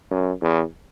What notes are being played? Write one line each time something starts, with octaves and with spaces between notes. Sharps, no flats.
F#2
E2